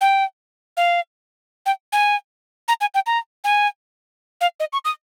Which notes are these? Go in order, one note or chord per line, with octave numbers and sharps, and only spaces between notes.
G5
F5
G5
G#5
A#5
G#5
G5
A#5
G#5
F5
D#5
C#6
D#6